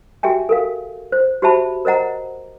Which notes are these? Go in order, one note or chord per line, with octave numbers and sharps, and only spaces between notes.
F#4 G4 E5 G5 G#5
A4 A#4 F5
C5
F#4 G4 C5 E5 A5 B5
A#4 C5 D#5 F#5 A#5